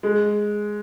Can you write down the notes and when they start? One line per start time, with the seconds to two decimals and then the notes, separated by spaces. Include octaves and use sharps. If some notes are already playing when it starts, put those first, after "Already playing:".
0.03 G#3